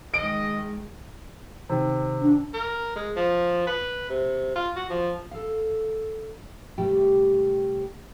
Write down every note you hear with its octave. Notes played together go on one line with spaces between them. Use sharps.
D#3 G#3 D#5 D7
C3 D#3
D4
A#4
G#3
F3
B4
C3
F4
F#4
F3
A4 F5
C3 G3 A3 G4 G5